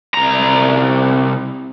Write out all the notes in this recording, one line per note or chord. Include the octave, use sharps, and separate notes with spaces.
C2 A#5